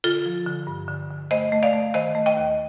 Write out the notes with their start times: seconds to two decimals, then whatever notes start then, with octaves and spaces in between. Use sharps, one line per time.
0.04 D3 F4 A4
0.25 F3
0.46 D3
0.67 G2
0.88 D3
1.10 D3
1.31 A3 C5 D#5
1.52 A3
1.63 D5 F5
1.73 A3
1.94 D#3 C5 D#5
2.15 A3
2.26 D#5 G5
2.37 D#2